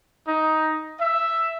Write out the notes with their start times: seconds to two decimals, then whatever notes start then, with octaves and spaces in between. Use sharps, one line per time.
0.26 D#4
0.99 E5